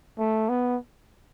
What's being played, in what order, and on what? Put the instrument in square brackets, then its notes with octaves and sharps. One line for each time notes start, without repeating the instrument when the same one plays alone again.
[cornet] A3
B3